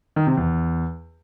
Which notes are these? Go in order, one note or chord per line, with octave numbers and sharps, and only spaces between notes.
D#3
C3
E2